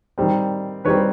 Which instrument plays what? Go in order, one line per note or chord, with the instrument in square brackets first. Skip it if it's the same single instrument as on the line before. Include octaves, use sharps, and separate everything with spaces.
[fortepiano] D#3 G3 C4
D#3 G3 C4 B4 C#5